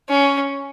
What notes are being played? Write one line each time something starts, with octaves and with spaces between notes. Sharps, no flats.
C#4